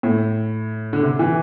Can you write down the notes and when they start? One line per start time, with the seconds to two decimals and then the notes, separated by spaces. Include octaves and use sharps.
0.03 A2
0.93 D3
1.03 C3
1.19 E3